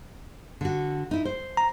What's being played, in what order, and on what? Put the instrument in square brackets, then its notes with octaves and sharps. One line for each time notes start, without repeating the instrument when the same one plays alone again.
[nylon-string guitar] D3 F#4
D#4 E4
C5
[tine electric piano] A#5